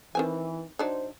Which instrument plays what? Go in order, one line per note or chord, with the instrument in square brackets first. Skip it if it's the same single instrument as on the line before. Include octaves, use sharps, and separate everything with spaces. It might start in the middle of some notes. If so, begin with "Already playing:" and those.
[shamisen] D#3 C4 G#5 [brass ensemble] E3
[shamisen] F#3 D4 D#4 [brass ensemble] C5